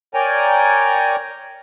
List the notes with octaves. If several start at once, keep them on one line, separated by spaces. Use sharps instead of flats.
A#4 C#5 D5 G5 G#5 A#5